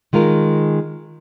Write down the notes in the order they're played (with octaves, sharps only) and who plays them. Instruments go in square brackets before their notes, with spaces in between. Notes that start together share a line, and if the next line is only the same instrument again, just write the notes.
[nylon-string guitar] D#3 G#3 F4 A#4